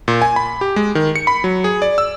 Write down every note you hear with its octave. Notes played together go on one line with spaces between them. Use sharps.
A#2
G#5
B5
G4
G#3
D#3
C#7
B5
F#3
G#4
D5
E6